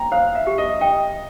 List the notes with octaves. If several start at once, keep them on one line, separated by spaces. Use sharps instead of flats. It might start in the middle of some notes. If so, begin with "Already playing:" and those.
Already playing: G5 A#5
C5 F5
E5
G4
D#5
D#5 G5